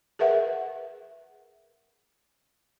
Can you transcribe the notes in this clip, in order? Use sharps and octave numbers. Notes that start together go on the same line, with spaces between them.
G#4 A#4 B4 E5 F#5